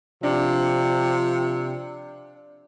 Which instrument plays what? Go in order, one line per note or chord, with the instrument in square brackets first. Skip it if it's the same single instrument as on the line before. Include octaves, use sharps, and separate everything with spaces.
[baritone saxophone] C3 [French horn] F3 [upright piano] D4